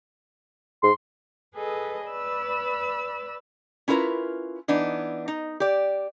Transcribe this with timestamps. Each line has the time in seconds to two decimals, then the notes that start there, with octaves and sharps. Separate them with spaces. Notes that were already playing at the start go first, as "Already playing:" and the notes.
0.83 G#2 C6
1.55 G#4 A4 B4 D#5
2.07 B4 D5 B5 E6
3.88 C#4 E4 F4 A#4 B4
4.68 E3 B3 D4 D#4
5.28 D#4
5.60 G4 D5